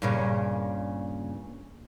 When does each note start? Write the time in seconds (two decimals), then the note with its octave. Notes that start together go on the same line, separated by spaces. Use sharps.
0.02 G2 A#2 C#3